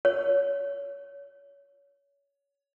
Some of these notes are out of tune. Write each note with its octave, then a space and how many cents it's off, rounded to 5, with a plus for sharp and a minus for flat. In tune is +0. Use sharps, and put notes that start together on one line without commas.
C#5 +25